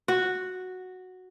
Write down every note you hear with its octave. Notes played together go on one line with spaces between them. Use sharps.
F#4